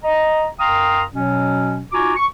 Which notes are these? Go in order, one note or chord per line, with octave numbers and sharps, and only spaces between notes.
D#5 A#5
F#2 F5 G5 A#5 C6 D#6
B2 F#3 C#4
D#4 F4 F#4 G#5 A#5 D6
C#6